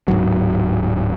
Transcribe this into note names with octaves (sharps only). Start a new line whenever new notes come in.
D1 A1 G#2 F#3